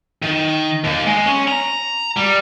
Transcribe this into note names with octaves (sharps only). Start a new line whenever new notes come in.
D#3
D#2
G#3
C#4
A#5
G3